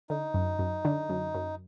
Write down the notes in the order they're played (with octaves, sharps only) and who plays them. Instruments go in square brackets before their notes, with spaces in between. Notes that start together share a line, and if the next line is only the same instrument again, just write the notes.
[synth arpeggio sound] D3 [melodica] D#4
[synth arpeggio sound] F#2
F#2
D3
F#2
F#2